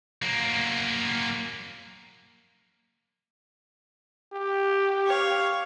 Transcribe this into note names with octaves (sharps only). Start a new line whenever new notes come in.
F#3 A#3
G4
C#5 F5